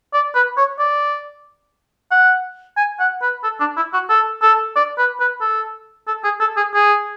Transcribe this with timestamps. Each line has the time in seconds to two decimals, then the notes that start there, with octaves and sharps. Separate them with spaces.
0.14 D5
0.35 B4
0.57 C#5
0.79 D5
2.12 F#5
2.77 G#5
3.00 F#5
3.22 B4
3.44 A4
3.60 D4
3.77 E4
3.94 F#4
4.10 A4
4.42 A4
4.76 D5
4.98 B4
5.20 B4
5.41 A4
6.07 A4
6.24 G#4
6.40 A4
6.57 G#4
6.74 G#4